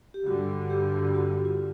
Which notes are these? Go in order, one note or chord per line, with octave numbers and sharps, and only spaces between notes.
G4
G2 D3 G3 F#4
G4
F#4
F4